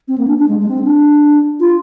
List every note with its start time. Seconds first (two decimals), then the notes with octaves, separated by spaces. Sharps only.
0.08 C4
0.18 A#3
0.27 D4
0.38 D4
0.48 G#3
0.59 G#3
0.69 C4
0.84 D4
1.60 F4